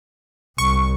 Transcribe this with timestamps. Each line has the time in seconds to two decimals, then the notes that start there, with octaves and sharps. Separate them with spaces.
0.58 C2 C#6